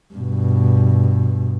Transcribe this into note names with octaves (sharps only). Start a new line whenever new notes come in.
G2 B2